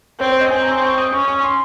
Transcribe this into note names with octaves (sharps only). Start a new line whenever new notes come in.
C4 C#5
C#5
D#5
C4 G#5
A#5
C6
C#6
D#6
C#4 C#6
C#6
C6